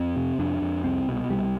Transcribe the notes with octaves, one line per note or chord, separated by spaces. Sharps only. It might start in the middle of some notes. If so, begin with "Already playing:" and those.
Already playing: F2 C4
C3
F2 D4
F2
C2 C4
B2
C2 G3